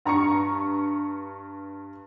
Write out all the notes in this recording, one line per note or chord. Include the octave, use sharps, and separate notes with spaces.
G2 A#5 C#6 C#7